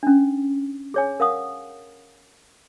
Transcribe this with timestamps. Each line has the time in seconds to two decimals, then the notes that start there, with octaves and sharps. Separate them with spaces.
0.03 C#4 D4
0.94 G#4 C#5 G#5
1.20 A#4 F5 F#5 D#6